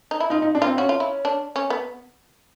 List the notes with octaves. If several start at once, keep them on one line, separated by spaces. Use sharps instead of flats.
D#4
E4
D#4 F4
D#4
D4
C4 F4
C#4 F#4
F4
E4
D4
C#4
B3